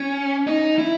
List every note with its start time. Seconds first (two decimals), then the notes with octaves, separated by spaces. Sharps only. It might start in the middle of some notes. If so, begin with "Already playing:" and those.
Already playing: C#4
0.47 D#4
0.78 E4